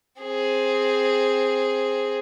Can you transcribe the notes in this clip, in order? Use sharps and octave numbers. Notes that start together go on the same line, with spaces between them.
C4 G#4